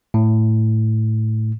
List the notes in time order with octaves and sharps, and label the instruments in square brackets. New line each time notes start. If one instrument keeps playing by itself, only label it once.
[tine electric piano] A2